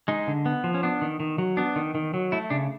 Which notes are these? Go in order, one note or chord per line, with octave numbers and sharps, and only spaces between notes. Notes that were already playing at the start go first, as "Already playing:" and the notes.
G#3 D#4
D3
B3
F3
C#4
B3 D4
D#3
D#3
F#3
B3 D4
D#3
D#3
F#3
A3 E4
C#3 D4